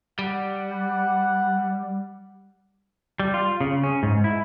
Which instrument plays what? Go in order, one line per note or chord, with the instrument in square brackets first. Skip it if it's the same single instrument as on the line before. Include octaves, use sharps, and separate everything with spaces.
[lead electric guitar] G3 [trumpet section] F#5
[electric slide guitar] G3
F4
C#3
C#4
G#2
E4